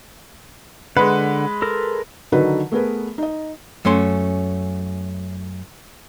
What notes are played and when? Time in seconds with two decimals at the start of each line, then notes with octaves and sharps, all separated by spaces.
0.97 D3 G#3 B4 F#5
1.62 A4 A#4
2.32 D3 D#3 F#3 D#4 F#4 B4
2.72 A3 B3 G#4 A#4 B4
3.18 D#4 D#5
3.85 F#2 A3 C#4 C6